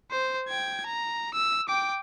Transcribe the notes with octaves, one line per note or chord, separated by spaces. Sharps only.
C5
G5 G#6
A#5
E6
G5 D6